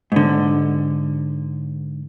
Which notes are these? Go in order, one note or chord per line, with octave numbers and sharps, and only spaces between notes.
G#2 D3